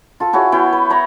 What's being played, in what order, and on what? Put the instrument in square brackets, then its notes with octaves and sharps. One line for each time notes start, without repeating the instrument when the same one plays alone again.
[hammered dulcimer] F4 A4
E4 F#4 G#4 C#5
B3 E4 G5
B4
C#5 A#5 B5